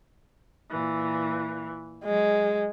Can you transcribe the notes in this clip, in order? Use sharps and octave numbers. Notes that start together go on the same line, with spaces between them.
A#2 E3
F#3 G#3